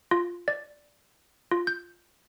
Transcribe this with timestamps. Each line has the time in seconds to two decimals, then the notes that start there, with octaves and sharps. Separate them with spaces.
0.11 F4
0.48 D5
1.51 F4
1.67 G6